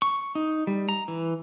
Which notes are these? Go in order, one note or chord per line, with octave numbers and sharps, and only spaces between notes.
C#6
D#4
G3
A#5
E3